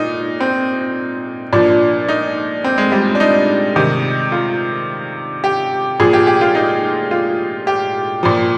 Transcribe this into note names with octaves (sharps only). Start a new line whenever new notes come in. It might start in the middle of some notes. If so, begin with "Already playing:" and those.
Already playing: A#2 D#4
C4
A#2 F3 D4
D#4
C4
G#3
G3
D4
D#4
C3 D#3
F4
G4
A#2 F3 G#4
G4
G4
F4
D#4
F4
G4
A#2 F3